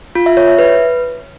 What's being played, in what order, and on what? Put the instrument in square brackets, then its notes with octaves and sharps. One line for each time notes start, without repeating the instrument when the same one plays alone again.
[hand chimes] F4
E5
C#5
E5
B4